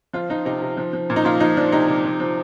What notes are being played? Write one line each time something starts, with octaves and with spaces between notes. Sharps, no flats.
F3 F4
F3 D#4
C3 D#4
C3
F3
F3
A#2
D#4
A#2 F4
F3 D#4
F3 D4
C3 D#4
C3
F3
F3